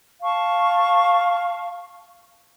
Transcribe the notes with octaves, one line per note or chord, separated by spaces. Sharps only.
F5 A5 C#6